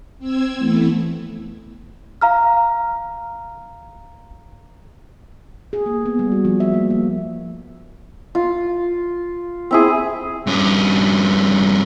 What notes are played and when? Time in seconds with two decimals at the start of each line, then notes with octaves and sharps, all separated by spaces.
0.19 C4 E6 G#6
0.58 E3 A3 B3
2.21 F5 A#5 F6
5.73 G#4
5.86 A#3
6.06 B3
6.19 G3
6.32 F#4
6.45 F3
6.60 E5
6.73 A#3
6.90 A#3
8.35 F4
9.71 C4 E4 G#4
10.47 G2 C#4